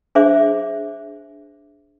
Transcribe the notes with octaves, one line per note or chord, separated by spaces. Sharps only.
D4 G#4 C5 E5 D6